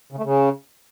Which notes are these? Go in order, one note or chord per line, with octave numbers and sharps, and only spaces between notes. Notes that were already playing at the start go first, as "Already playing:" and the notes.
C#3
A3
C#3